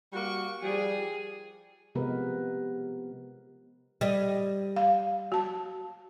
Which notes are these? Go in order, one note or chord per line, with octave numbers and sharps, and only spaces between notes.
G3 A#3 F#4 C#6
F3 G3 G#4
C3 F3 G#3 B3 A#4 B4
G3 D#5
F5
F#4 A5